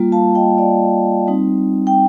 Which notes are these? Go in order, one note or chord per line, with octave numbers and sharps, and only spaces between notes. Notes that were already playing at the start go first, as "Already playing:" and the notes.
Already playing: G3 A#3 F4
F5 A5
D#5 G5
D5 F5
G3 C4 D#4
G5